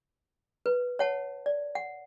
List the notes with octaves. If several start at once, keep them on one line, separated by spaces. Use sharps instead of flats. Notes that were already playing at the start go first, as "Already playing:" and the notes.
B4
C#5 F#5 A5
D5
F#5